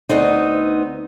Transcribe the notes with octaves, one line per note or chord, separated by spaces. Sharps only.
D2 B3 C4 D#4